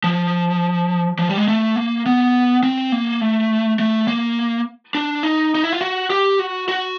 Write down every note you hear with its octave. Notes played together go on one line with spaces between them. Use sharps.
F3
F3
G3
G#3
A3
A#3
B3
C4
A#3
A3
A3
A#3
D4
D#4
D#4
E4
F4
F#4
G4
F#4
F#4